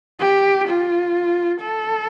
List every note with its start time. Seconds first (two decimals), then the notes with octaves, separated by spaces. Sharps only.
0.20 G4
0.68 F4
1.60 A4